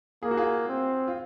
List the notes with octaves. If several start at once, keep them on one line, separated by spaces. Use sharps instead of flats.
A#3 G#4
F#4
F4 G#4
C4
F4